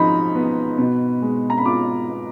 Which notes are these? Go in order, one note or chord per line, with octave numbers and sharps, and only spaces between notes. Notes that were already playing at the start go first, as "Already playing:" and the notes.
Already playing: G#2 F3 D#4 A#5 B5
B3
B2
G#3
A#5
B5
F4 D6
B3